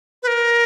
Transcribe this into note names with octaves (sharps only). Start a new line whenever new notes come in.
B4
A#4